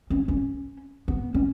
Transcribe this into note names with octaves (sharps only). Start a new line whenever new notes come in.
C#4
C#4
B3
C#4